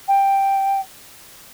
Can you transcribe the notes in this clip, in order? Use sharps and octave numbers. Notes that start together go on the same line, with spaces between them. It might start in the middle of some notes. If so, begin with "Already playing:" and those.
G5